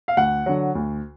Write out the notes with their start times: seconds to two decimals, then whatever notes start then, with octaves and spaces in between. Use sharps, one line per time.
0.08 F5
0.17 D2 F#5
0.46 D3 F#3
0.75 D2